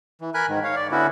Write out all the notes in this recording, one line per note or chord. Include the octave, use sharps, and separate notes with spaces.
E3
A#4 G#5 B5 F#6
G#2 D#3
C#5 F5
D5
D3 B3 C#4 E4 F#4